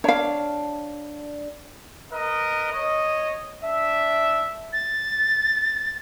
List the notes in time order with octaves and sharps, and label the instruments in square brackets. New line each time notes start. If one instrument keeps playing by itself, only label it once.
[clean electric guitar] D4 [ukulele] C#5 F5
[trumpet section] A#4 B4 D#5
C#5 D#5
D4 E5
[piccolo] A6